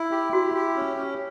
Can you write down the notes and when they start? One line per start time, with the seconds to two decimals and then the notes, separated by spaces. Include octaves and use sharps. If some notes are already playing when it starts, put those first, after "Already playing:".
Already playing: E4
0.11 G4
0.33 E4 F#4
0.55 G4
0.76 C#4
0.97 C#4